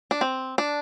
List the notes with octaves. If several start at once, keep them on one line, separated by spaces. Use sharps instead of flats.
D4
C4
D4